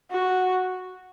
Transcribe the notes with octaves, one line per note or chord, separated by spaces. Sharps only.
F#4